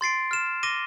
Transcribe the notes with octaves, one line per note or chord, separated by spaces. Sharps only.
C6 A6 C7 D7
F6 E7
D6 A#6 D#7 G7